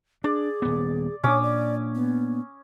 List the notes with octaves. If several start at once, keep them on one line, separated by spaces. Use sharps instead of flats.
D4 G#4 D5
D#1 B3
A#2 C#4 D4 C#5 D6 D#6
D5
B3